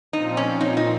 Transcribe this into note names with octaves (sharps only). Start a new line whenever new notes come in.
A#2 F3 C4 D#4
C#4
D#4
D#4